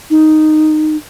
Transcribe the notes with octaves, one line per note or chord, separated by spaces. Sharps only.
D#4